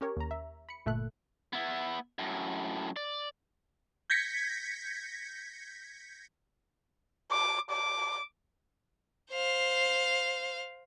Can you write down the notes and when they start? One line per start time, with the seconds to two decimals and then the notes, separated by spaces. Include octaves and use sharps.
0.01 C#4 G4 A#4 C#5
0.17 D#2 A#5
0.31 E5
0.69 B5 C#7
0.86 G1 A#2 A3 A4 E5 F#6
1.53 B3 E4
2.19 F#2 A2
2.96 D5
4.10 G6 G#6 A#6 B6 C#7
7.31 D6
7.71 D6
9.31 C5 F5